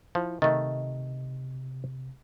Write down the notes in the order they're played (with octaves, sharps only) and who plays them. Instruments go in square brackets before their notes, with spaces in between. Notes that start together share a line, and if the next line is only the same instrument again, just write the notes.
[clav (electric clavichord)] F3 [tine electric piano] E4
[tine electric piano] C3 [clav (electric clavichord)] D#3 A3 [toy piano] D#5